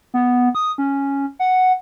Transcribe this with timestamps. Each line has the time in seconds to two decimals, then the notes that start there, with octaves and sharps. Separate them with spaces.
0.14 B3
0.55 D#6
0.78 C#4
1.39 F#5